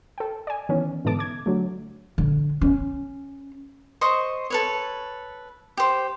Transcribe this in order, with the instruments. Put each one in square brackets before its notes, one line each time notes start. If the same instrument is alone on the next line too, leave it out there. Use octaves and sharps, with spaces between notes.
[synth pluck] A4 G5
D5 G#5
D#3 E3 B3 C#4
G#2 B2 D3 E3 A5 D6
D6 G#6
D3 F#3 A3
[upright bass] D3
C#4
[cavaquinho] C5 D#5 C#6
A4 B4 C#5
G4 C5